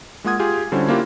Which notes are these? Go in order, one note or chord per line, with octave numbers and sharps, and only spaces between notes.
G#3 A#3 F4 F#5 D#6 G#6
F4 G4 G#4 G#5
D3 G3 C#4 E4 F#4 C5
A#3 D4 E4 F4 G4